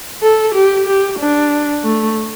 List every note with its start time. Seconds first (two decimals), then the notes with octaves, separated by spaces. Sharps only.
0.22 A4
0.55 G4
0.87 G4
1.19 D4
1.84 A3